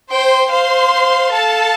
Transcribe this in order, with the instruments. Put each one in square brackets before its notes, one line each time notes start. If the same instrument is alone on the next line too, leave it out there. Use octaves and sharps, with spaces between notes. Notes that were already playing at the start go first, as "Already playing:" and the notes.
[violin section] C5 C6 [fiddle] G5
[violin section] C5 C6 [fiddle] F5
[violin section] A4 A5